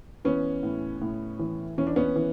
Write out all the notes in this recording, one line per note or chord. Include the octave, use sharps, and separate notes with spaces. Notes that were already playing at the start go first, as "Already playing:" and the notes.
E3 B3 C#4
A2
A2
E3
E3 C#4
D4
B3 C#4
E3